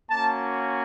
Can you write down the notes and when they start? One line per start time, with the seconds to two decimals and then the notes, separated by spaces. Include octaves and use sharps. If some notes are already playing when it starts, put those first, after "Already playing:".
0.10 A#3 C#4 F#4 A5